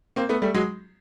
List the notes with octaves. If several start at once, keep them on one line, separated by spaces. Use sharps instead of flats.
A#3 C4
A3 B3
G3 A3
F#3 G#3